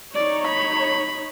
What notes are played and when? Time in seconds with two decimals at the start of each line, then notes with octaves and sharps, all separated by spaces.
0.15 D#4 C#5 D5
0.48 B5